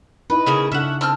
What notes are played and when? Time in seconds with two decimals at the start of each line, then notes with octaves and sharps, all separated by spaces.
0.30 D#4 E4 B4 D#5
0.46 C#3 A#3 G#4
0.72 C#3 C#4 D4 A4 E5 F#5
1.01 C4 A5 E6 F6